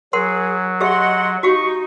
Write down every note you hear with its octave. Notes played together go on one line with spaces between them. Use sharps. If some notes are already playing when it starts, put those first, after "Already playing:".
F#3 G#4 A#4 F#5 C6
G4 G#4 D#5 E5 F#5 C6
D#4 F#4 G4 F5 C#6